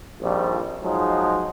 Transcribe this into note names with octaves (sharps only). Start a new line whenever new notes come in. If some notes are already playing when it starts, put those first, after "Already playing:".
A#1 F2 D#3 F3 G3
F3 F#3 G#3 D#4